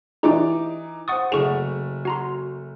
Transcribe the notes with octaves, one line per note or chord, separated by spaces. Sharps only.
E3 D#4 G4 D5 A#5 D6
C5 F#5 C#6 D#6 A6
F#1 A3 G#4 F#5 C#6 F7
F#4 A#5 C6